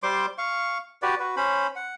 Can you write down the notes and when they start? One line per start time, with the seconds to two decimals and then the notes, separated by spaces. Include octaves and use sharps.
0.03 G3 C5 C6 D6
0.38 F5 C#6
1.02 F#4 G4 B4 D5
1.19 F#4 B4
1.37 C#4 C5 B5
1.76 F#5